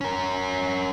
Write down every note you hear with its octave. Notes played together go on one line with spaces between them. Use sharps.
C#4 A#4